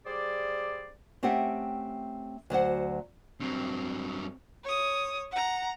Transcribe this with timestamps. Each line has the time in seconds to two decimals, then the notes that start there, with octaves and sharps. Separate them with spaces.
0.06 G3 G#4 C5 D5
1.23 A3 C4 C#4 G4 E5 F#5
2.50 D2 F#3 C5 F#5
3.40 G2 F#3 C4
4.64 C#5 D#6
5.32 F#5 A#5